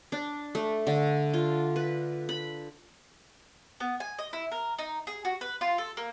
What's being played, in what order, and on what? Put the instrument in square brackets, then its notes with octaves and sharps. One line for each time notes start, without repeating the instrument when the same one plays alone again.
[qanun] D4
A3
D3
F4
B4
B5
[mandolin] B3
G#5
D#5
E4
A#4
D#4
G#4
F#4
B4
F4
A4
A#3